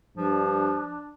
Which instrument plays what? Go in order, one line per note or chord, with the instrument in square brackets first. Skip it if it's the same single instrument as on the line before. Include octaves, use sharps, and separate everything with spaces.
[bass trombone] G2 [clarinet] F3 [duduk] D4